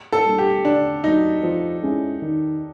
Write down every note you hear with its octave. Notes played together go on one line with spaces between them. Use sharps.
A4
G3 A#3 D4
G4
D3 D4
F#3 A#3 D#4
F3
G#3 C#4 E4
D#3